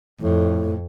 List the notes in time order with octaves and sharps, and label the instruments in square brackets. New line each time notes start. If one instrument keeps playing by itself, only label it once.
[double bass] F2 [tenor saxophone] A2